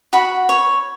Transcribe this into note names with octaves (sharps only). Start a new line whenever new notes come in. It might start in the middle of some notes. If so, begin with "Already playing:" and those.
F#4 B5
C#5